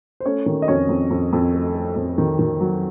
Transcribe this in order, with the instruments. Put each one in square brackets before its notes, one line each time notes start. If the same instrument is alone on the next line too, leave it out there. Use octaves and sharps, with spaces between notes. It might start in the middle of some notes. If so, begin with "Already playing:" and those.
[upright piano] C5
A3 C#4 C#5
D#3
D#5
F2 C#4 C#5
F2
F2
F2
A3
A3
F2
D#3
D#3
F#3